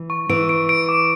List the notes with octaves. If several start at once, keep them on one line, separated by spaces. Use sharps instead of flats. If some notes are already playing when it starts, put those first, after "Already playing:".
Already playing: E3
C#6
E3 D7
D7
D7
D6